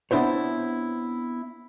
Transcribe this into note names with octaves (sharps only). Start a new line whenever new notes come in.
B3 C4 D4 E4 C5 C#5